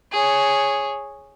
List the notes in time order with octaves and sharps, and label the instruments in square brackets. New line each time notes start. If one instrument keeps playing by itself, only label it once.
[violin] G#4 C#5